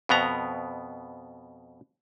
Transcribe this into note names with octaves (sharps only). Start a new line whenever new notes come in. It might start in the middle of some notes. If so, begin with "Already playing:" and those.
F2 B2 B3 A#5